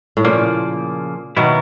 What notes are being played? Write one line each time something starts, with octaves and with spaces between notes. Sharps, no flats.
A2
A#2 C#3 F3 A#3
B2 D#3 F#3 B3 E4